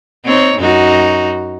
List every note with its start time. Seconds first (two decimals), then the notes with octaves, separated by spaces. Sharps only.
0.25 C4 D#4 C#5
0.59 F#2 D#4 F#4